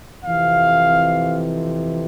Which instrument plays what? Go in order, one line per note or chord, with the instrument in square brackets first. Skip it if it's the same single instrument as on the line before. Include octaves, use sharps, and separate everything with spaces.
[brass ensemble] F2 C3 E3 F5